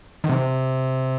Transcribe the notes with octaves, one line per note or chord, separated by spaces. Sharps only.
D#3
C3